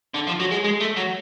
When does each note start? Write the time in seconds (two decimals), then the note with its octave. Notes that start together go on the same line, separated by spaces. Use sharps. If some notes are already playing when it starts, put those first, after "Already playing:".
0.14 D3
0.27 F3
0.40 F#3
0.51 G#3
0.64 G#3
0.80 A3
0.97 F#3